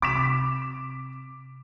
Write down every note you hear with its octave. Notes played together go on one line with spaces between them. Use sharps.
C3 D6 B6 E7